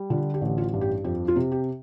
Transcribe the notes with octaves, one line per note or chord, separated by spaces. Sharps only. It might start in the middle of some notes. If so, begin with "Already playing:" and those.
Already playing: G3
D3 F4
G4
A1
F4
G2
G4
F2 G4
F4
C3
G4